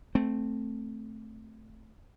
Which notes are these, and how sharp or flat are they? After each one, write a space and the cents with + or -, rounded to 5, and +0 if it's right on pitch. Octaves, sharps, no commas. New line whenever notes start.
A3 +0 C4 +0